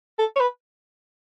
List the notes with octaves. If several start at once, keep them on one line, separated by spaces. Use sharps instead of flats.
A4
C#5
B4